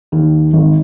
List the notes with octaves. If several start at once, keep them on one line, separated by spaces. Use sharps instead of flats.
D#2
G#1